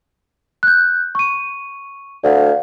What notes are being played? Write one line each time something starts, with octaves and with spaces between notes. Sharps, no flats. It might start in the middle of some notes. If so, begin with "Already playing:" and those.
F#6 G6
C#6 D#7
D2 D5 F5 F#5